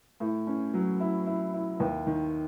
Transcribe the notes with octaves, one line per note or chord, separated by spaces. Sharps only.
A2
C#4
F#3
E4
E4
E4
D#2
D#3